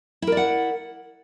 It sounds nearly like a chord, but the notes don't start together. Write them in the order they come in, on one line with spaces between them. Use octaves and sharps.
E4 A#4 D5 F#5